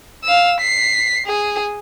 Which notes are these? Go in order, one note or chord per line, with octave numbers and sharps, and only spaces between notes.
F5 E6
B6 C7
G#4